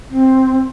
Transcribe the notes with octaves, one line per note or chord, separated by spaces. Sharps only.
C4